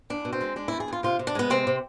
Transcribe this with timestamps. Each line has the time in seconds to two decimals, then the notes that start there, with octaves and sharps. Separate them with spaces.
0.10 E2 D4
0.25 B2
0.33 C4
0.41 G#3
0.56 G#3 D4
0.68 E2 E4
0.80 G#4
0.88 E2 F4
1.03 C3 F4
1.19 C3
1.27 D4
1.35 G#3 B3
1.50 C3 C4
1.67 C3